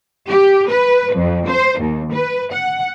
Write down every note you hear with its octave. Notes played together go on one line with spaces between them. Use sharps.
G4
B4
F2
C5
D#2
B4
F#5